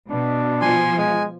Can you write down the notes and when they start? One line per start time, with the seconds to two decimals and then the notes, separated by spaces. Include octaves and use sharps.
0.11 B2 D4
0.61 F3 G#5 C6
0.98 G#3 G#5